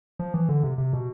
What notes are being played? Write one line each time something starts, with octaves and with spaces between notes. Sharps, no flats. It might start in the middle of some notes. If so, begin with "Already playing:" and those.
F3
E3
D3
C3
C3
B2